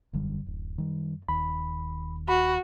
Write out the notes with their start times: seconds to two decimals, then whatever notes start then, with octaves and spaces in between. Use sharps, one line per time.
0.13 E1 F#2 D3 G3
0.46 D1
0.78 D#3 G3
1.29 D#1 D#2 B5
2.29 F#4 B5